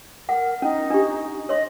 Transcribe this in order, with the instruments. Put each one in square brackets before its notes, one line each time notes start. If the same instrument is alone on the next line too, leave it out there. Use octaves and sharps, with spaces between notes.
[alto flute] A#4 [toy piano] F#5
[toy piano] C#4 [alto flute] D#4
[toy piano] D4 G4
[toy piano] C#5 C6 [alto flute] D#5